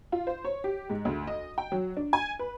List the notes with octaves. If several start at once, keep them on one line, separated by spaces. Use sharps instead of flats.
F4
C5
C#5
G4
G#2
D2
D#5
G5
F#3
D4
G#5
B4